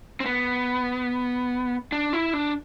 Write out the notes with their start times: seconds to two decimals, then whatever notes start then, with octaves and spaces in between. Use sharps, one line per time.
0.20 C4
0.26 B3
1.92 D4
2.13 E4
2.33 D4